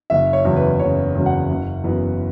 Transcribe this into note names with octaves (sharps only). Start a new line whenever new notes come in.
F#1 E5
C#5
E2 C#3 F#3
B4
F#1 C#5
E2 C#3 F#3
F#5
F#1
F#2 E3 B3